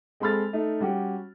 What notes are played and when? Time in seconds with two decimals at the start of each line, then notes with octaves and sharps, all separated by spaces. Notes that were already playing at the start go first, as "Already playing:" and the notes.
0.20 G#3 C4 A4 B5 F6 A6
0.53 A3 D#4
0.80 G3 C#4 F#4 G4